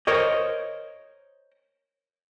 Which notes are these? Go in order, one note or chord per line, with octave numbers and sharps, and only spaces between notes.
A#4 C5 C#5 D#5